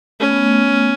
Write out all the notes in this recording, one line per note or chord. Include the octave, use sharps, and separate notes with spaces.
A3 C#4
B3
A3
B3
A3
B3